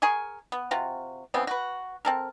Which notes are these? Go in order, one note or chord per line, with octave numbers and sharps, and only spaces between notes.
G#4 A#4 G#5 C#6
B3
C3 C4 F4 F#4
C#3 E3 B3 C4
F#4 B4
C4 A4 A#4